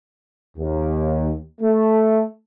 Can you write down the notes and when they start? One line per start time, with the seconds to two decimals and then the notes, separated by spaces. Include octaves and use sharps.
0.58 D#2
1.61 A3